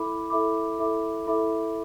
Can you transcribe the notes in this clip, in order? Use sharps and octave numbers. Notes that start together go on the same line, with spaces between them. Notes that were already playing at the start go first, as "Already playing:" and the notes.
Already playing: E4 A4 E5 B5 D6
E4 A4 E5 B5 D6
E4 A4 E5 B5 D6
E4 A4 E5 B5 D6